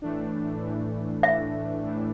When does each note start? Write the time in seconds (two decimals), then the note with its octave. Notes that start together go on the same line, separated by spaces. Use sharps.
0.02 A2 E3 A3 D4
0.62 A2 E3 A3 D4
1.23 A2 E3 A3 D4 E5
1.83 A2 E3 A3 D4